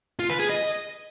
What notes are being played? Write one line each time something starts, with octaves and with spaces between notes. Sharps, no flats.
F4
B4
G#4
D#5